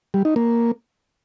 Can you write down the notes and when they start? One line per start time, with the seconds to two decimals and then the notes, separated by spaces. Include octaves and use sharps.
0.14 G3
0.25 D#4
0.36 A#3